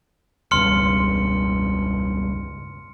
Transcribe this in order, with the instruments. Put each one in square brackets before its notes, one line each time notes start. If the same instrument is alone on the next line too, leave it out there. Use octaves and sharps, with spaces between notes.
[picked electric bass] E1 C#2 G2 [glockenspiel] C6 F6 C#7